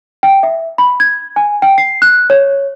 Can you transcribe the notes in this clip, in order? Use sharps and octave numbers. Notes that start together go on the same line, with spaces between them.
G5
E5
B5
G#6
G#5
G5
C7
F#6
C#5